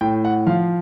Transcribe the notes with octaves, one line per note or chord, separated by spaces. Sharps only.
A2 G5
F#5
F3 F5